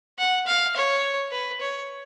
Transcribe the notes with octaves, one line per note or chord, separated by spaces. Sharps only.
F#5
F5
C#5
B4
C#5